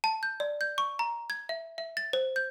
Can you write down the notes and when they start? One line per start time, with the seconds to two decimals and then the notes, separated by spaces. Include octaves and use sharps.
0.04 A5
0.23 G6
0.40 D5
0.61 G6
0.78 C#6
0.99 A#5
1.30 G#6
1.49 E5
1.78 E5
1.97 A6
2.13 C5
2.36 G6